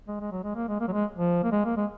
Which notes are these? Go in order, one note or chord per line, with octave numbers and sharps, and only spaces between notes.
G#3
G#3
F#3
G#3
A#3
G#3
A#3
F#3
G#3
F3
A#3
G#3
A#3
G#3